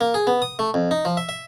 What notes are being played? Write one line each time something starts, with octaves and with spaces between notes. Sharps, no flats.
A#3
G#4
B3
D#6
A3
F2
D#4
F3
E5
E5